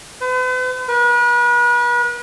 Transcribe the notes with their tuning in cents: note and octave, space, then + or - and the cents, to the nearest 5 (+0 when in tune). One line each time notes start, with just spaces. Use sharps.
B4 +45
B4 -40